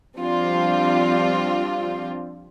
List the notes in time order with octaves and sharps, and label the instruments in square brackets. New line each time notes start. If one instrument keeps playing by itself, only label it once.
[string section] F3 G3 C4 D4 F4